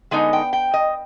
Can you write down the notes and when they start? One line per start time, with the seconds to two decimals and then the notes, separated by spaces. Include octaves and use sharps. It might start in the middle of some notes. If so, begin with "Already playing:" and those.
0.11 D3 G#3 B3 D#4 G#5
0.33 G5
0.53 G5
0.74 D#5